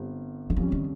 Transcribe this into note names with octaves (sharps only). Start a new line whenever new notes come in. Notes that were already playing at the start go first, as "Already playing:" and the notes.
Already playing: G1 G3 C4
D#3
F2 C#3 F3 G3 C#4
D#3